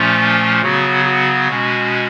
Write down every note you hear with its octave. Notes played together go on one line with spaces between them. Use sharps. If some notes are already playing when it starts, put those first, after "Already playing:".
Already playing: A#2 F3 A3 C#4 F4
C#3 F#3 B3 F#4
F#4
B2 G#3 C#4